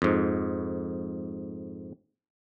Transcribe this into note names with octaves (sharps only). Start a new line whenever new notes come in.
F2 G#2